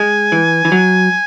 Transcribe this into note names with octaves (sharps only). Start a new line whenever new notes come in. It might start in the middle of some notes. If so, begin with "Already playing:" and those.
Already playing: G#3 G#5
E3
E3
F#3